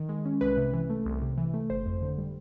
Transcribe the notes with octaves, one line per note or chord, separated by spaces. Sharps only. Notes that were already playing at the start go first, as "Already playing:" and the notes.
Already playing: D#3
G#3
C#4
C2 B4
C3
E3
A3
C2
C3
E3
A3
G1 C5
F2
D3
G3